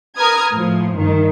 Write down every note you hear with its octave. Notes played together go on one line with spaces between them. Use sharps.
A#4 B4 D#6 F6 G#6
A2 F3
G2 D#3